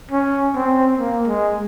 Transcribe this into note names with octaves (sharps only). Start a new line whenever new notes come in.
C#4
C4
A#3
G#3